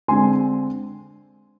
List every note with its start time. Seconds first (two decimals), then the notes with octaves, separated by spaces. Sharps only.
0.08 D3 G#3 C4 G#5 C6